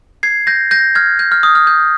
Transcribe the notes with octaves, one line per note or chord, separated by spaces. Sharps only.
G#6 C7
G6 A#6
G6 A#6
F6 G#6
G6
F6
D#6
F6
G6